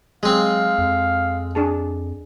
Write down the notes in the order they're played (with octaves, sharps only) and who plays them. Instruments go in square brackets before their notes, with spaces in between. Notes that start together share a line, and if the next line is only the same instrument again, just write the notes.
[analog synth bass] F#3 [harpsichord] G#3 C4 [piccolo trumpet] F5
[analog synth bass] F2
[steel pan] D4 G#4 A5